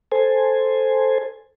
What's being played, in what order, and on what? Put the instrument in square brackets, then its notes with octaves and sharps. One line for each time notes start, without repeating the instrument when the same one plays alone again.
[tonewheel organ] A4 C5 G#5